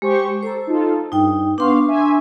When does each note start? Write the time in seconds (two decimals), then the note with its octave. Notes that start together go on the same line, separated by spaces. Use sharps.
0.02 G#3 G4 C5 C#6
0.43 A4 C5 A#5
0.67 D#4 F4 A4
1.12 G2 D#4 G5
1.58 B3 D4 F5 C6 C#6
1.88 E5 G#5